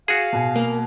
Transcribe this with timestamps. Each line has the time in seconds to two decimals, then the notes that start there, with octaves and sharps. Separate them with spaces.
0.08 F#4 G#4 F5
0.33 B2 G#5
0.56 A#3